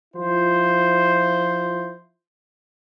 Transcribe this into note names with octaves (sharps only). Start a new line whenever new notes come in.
F3 E4 F4 C5